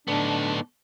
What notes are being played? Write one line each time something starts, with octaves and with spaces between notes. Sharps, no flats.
A2 D3 A3 B3 D4 D#4